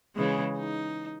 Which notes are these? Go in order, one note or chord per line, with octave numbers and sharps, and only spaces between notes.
C#3 E3 G#3
D#4